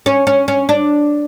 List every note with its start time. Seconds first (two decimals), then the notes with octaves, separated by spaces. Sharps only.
0.06 C#4
0.27 C#4
0.48 C#4
0.69 D4